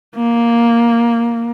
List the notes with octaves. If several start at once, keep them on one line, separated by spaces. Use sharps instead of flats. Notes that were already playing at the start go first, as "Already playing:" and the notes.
A#3